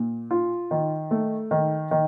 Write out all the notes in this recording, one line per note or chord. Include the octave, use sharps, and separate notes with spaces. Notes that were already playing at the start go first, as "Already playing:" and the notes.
Already playing: A#2
F4
D#3
A3
D#3
D#3